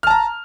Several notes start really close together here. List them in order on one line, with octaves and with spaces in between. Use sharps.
F6 A5 A#5